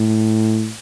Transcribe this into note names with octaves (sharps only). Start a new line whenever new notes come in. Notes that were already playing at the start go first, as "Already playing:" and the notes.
Already playing: A2